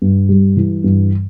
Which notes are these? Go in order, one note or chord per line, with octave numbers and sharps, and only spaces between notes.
G2
G3
E3
G2